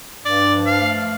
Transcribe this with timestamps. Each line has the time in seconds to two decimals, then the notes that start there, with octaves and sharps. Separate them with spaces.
0.25 G2 D5
0.52 F3
0.66 F5
0.80 A3